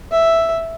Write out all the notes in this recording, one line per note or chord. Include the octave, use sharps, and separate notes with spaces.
E5